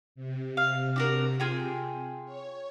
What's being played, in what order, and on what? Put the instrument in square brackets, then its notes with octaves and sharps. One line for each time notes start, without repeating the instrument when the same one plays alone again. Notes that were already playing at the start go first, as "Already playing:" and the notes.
[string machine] C3
[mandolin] F5
D4 F#4 A#4
F4 G#4 G5
[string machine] C#5